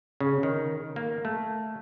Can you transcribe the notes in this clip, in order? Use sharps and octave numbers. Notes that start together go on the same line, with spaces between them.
C#3
D#3
A#3
A3